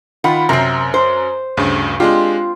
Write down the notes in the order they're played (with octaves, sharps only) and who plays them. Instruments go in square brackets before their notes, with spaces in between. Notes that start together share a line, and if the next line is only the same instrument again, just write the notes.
[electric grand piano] D#3 F4 B5 [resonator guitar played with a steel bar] F#5
[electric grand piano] F#2 A#4 A#5 [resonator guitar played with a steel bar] C3 C4
[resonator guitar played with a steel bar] C5
[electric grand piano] D2 G2 C#3
[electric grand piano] G#3 D4 G4 [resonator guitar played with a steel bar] C4 F4